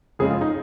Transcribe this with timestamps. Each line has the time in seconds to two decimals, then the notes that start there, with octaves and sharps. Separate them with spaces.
0.19 F2 C#3 G#3 C#4 G#4
0.31 F4
0.41 D#4